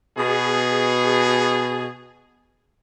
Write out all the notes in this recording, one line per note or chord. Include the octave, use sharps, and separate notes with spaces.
B2 G#4